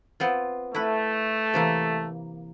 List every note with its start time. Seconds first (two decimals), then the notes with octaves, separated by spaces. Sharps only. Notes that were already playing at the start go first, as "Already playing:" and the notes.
0.20 B3 C4 F4
0.75 A3 E4 B4
1.54 C3 E3 A#3